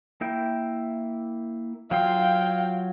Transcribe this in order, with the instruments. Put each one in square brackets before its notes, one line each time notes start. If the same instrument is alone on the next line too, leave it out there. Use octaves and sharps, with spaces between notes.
[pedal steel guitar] A#3 E4 G5
[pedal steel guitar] F#3 F4 C6 [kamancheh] F5 G5